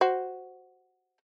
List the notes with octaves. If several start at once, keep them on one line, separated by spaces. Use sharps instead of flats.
F#4 C5